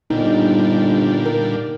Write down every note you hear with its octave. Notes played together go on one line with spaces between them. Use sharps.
G1 A#2 D3 G3 D#4
A#4